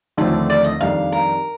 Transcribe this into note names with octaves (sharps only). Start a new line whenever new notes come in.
D#2 D3 F3 A3 C4 D5
D5
D#5
F2 D#3 G3 D4 F5
A#4